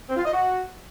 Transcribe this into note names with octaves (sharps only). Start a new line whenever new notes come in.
C4
F4
D#5
F#4